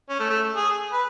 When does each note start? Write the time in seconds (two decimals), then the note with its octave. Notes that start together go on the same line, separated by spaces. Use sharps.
0.09 C#4
0.19 A3
0.29 A3
0.55 G#4
0.93 B4